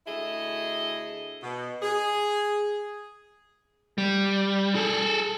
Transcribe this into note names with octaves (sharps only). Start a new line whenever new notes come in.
D2 E4 G#4 A4 D#5
B2
G#4
G3
G#4 A4